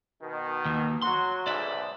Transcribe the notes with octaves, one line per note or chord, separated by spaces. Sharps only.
B2 D#3
D#2
F#3 F#4 C6
B1 G#2 D5 E5